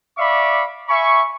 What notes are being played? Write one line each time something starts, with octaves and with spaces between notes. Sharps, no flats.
D5 E5 F5 B5 C#6 D6
E5 G#5 B5 C#6